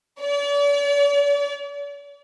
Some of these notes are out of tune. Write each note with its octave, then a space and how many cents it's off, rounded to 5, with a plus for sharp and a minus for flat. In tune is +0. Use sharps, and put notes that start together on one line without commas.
D5 -45